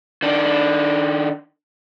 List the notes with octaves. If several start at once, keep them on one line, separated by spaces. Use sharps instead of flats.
D#3 D4